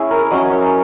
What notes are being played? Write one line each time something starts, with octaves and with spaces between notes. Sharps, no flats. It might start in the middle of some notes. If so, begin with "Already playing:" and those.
Already playing: C#4 E4 G#4
A#4
F#3 C#4 E4 D#5
C#5